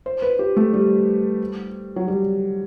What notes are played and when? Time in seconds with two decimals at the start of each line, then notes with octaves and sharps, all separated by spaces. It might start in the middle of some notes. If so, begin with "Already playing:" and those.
0.06 C5
0.22 B4
0.39 G4
0.57 A3
0.73 G3
1.96 F#3
2.08 G3